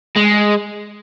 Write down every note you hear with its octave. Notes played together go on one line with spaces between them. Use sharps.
G#3